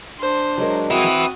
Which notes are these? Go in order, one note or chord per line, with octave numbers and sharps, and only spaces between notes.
D4 C5
F#3 G#3 A#4
C4 F#4 B4 E5 D#6